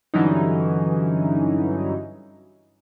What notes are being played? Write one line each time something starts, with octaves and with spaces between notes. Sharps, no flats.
G2 D3 E3 F#3 C#4 D#4